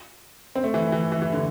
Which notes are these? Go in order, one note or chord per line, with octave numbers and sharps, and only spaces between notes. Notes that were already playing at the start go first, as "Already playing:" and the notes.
C4
A3
E3
E3
E3
E3
D3